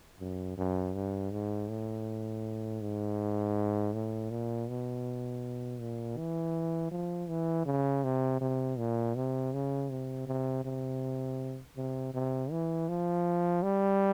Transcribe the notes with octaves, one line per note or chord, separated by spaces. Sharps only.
F#2
F#2
G2
G#2
A2
G#2
A2
A#2
B2
A#2
E3
F3
E3
C#3
C3
C3
A#2
C3
C#3
C3
C3
C3
C3
C3
E3
F3
G3